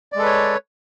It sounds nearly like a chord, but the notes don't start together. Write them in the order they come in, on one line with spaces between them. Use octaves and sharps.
D5 G#3 A4 B4 C#5